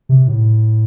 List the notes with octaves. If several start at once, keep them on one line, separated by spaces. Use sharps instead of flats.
C3
A2